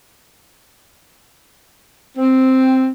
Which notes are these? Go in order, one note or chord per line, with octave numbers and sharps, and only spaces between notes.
C4